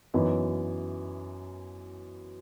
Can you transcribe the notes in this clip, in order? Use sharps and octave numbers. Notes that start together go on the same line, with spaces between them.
F#2 E3 B3 D#4